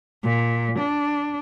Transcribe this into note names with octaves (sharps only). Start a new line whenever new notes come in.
A#2
D4